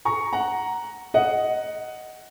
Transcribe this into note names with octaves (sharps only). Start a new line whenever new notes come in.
A#5 C#6
F#5 A#5
D#5 F#5